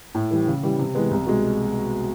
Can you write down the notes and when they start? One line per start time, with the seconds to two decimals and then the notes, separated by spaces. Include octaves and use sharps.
0.15 A2
0.31 E3 G3
0.47 C#3
0.63 E3 G3
0.79 C3
0.95 E3 G#3 B3
1.11 C2
1.26 B2 G#3